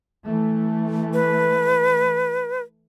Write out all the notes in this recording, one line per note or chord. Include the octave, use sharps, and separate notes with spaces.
E3 A3
B4